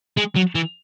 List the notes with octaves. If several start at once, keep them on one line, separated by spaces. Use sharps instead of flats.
G#3
F#3
E3